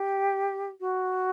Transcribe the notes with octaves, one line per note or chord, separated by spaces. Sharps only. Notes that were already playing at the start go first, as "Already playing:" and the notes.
Already playing: G4
F#4